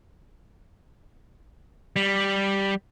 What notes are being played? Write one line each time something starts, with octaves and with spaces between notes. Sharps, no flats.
G3